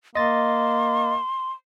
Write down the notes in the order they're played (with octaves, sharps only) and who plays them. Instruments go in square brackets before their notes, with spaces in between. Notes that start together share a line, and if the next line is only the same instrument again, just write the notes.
[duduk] A#3 [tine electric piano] D#5 A6 [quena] C6